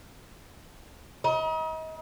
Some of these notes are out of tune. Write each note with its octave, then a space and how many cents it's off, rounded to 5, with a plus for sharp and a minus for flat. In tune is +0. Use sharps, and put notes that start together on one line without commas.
D#5 +35 A#5 +45